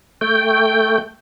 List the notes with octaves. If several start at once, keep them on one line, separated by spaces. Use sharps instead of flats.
A3 G5